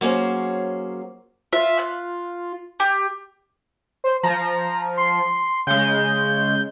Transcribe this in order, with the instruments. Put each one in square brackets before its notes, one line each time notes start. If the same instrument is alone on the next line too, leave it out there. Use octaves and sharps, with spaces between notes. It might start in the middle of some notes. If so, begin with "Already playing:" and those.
[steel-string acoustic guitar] F#3 A#3 C#4 G#4 C5
[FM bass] F4 [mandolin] E5
[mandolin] F#6
G4
[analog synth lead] C5
[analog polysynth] F3 [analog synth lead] A#5
[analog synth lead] C6
[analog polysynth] C#3 G#3 [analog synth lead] G6